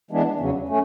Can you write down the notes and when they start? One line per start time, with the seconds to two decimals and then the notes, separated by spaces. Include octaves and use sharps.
0.11 E3 G#3 B3 D4
0.40 E2 C#3 F#3
0.69 A3 C#4